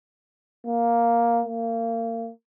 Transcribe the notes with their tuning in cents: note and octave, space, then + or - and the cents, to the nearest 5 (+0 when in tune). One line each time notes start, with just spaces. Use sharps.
A#3 +5
A#3 -30